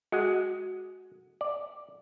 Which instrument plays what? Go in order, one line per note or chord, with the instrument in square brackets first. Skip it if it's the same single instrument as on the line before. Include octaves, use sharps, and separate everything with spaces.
[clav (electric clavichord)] G#3 [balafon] F#4 F#5
[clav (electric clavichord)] D5